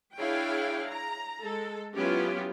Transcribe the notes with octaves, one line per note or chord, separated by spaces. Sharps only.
D4 E4 G#4 C#5 F5 G5
A#5
G#3 A4
F#3 B3 C#4 E4 F4 G4